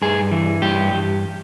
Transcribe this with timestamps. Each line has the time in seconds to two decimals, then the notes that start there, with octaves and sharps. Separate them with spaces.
0.02 G2 G#4
0.32 E3
0.62 G2 G4
0.93 G2